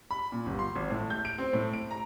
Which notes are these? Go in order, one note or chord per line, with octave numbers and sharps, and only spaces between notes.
B5
A#2
G1
C6
G#1
A2
G6
D7
C4
A2
D7
A#5